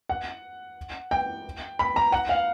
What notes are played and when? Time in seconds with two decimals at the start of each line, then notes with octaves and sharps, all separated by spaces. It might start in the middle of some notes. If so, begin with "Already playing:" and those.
0.09 F#5
1.11 G5
1.79 B5
1.96 A#5
2.12 F#5
2.29 F5